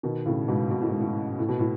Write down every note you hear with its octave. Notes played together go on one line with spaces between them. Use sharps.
B2 D#3
A2 C#3
G#2 B2
B2
A2
G#2
A2
A2
B2
A2